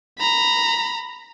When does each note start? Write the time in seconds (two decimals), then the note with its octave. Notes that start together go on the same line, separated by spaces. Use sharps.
0.18 A#5 B5